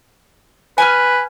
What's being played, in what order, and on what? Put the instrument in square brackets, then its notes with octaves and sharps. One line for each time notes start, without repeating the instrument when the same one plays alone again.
[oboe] B4 [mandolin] G#5 F6